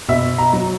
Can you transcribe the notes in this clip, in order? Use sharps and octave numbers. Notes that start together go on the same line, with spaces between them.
B2 E5
A#5
F#3